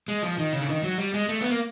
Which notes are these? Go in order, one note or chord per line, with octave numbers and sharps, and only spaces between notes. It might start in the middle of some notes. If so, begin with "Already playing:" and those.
G#3
F3
D#3
C#3
D3
D#3
F#3
G3
G#3
A3
B3
A#3